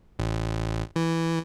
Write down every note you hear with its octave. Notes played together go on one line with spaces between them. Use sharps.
A1
E3